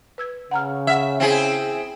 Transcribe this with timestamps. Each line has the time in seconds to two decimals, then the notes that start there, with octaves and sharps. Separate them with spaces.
0.18 B4 E6 G#6
0.51 C#3 F#5 A#5 F6
0.87 E5 F#5 F6 G#6
1.20 C4 E4 G#4